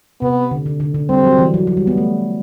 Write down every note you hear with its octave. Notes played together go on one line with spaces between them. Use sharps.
C3 B3
D3
D3
D3
D3
G3 C4
F#3
E3
F#3
F#3
G3
B3
A3